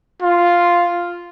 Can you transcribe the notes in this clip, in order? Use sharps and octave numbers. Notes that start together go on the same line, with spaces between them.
F4